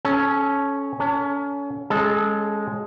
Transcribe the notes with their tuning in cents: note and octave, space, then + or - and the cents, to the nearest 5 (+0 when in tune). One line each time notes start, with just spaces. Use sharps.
C#4 +0 A4 -30
C#4 +30 A4 +30
G#3 +0 C#4 +0 A4 -20